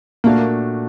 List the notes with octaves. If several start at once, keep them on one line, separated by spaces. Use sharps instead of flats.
A#2 A3 A#3 D4 F#4